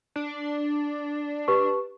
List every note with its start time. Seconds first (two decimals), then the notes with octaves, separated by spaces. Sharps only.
0.16 D4
1.48 G4 B4 C#6